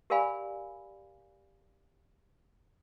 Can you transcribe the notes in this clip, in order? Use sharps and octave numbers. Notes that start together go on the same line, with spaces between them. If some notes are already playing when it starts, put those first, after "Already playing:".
G4 A#4 D5 F5 G#5 B5